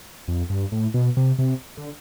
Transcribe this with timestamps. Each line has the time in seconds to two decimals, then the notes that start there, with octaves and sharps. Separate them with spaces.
0.28 F2
0.50 G2
0.72 A2
0.94 B2
1.17 C3
1.39 C3
1.77 D3